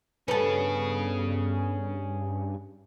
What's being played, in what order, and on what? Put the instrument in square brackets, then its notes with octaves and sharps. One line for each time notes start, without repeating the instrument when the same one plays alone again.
[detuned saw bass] G2 [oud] B3 A4 [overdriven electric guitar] C#4 G#4